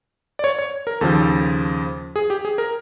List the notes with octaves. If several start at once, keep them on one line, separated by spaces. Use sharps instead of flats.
D5
C#5
C#5
A#4
D#2 C#3 F3 A4
G#4
G4
G#4
A#4